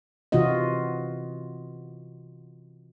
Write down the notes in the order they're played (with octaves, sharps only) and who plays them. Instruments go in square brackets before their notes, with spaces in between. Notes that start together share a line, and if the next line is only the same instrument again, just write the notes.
[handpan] C3 E3 F4 F#4 D#5